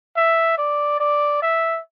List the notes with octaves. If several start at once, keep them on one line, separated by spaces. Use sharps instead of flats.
E5
D5
D5
E5